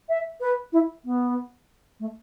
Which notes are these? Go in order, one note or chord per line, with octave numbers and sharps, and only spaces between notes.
E5
B4
E4
B3
A3